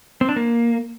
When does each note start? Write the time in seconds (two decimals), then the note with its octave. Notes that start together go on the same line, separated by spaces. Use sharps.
0.21 C4
0.29 D4
0.36 A#3